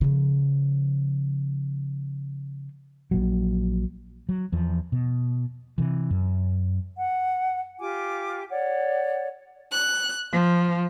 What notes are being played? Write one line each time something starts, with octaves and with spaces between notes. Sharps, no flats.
C#3 F3
A#1 A#2 F#3
F#3
E2 F3
B2
C3 E3
F#2
F#5
F4 G4 G#5 D6
C#5 D5 F#5
F#6
F3